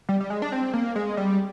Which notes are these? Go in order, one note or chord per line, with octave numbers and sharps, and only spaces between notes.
G3
G3
G#3
D4
C4
A#3
G#3
G3